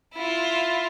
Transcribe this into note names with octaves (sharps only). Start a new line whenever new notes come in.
E4 F4